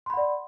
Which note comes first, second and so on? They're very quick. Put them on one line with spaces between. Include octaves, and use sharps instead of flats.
C6 B5 F#5 D5